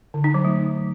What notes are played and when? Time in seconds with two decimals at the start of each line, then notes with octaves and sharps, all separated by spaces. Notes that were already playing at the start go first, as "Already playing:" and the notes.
0.14 D3
0.24 D#4
0.34 F#3
0.45 A3